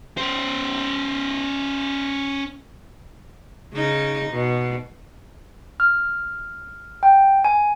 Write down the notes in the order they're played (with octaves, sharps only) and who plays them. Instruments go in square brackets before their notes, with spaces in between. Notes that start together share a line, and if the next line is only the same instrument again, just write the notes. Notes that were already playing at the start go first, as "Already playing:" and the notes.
[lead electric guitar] C#4 C5
[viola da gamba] C#3 D#4
B2
[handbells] F6
G5
G#5